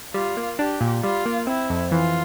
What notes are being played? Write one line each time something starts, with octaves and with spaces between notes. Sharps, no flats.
G3 F4
A#3
D4 G4
A#2
G3 F4
A#3
C4 E4
F2
E3 F4